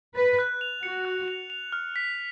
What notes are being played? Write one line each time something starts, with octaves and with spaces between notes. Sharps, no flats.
B4 A6
F#6
F7
F#4 C#7
F#6
F7
F7
F6
B6